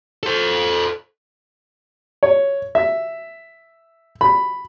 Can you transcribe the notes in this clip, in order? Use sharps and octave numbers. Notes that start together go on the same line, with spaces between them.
A4 C5
C#5
E5
B5